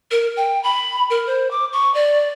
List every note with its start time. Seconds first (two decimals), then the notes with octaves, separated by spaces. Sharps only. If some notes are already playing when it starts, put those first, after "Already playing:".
0.11 A#4
0.37 G5
0.64 B5
1.10 A#4
1.27 C5
1.51 D6
1.73 C#6
1.94 D5